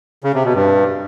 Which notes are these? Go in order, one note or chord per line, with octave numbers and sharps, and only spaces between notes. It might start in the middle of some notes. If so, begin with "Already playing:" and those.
C#3
C3
B2
G2